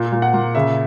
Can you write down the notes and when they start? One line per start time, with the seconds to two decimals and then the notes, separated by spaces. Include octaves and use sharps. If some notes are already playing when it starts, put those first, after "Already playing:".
Already playing: A#2
0.12 A#2
0.22 F#5
0.34 A#2
0.55 C#3 E5